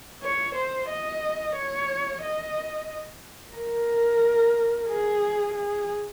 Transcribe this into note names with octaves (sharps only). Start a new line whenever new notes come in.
C#5
C5
D#5
C#5
D#5
A#4
G#4
G#4